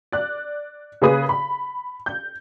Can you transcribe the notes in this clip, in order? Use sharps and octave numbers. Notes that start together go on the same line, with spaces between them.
D5 F#6
C#3 A#3 G#4 B4 D#6
B5
G6